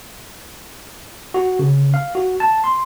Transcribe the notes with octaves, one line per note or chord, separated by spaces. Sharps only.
F#4
C#3
F5
F#4
A5
C6